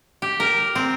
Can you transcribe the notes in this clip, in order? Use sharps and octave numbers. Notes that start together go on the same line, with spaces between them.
G4
A#4
C4